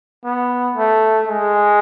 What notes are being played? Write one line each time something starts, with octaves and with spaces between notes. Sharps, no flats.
B3
A3
G#3